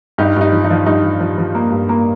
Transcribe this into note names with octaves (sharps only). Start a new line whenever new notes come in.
G2 D#4 G4
G2 D#4
F3
D#4
F3
G2 D#4
F3
F3
F3
A#3
G2
A#3